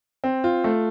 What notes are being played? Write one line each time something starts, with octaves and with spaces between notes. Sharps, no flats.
C4
F4
A3